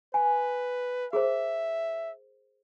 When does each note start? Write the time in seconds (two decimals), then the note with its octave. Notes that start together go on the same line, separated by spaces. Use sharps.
0.14 B4 G#5
1.13 G#4 A#4 C5 E5